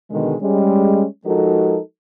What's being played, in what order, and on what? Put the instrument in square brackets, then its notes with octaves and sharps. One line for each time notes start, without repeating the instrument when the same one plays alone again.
[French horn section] B2 D3 D#3 G#3
G3 G#3 C#4
F3 G#3 D#4 F#4 A4 A#4